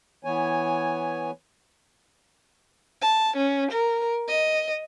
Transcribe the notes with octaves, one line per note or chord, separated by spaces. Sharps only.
E3 B3 C#5 G#5
A5
C#4
A#4
D#5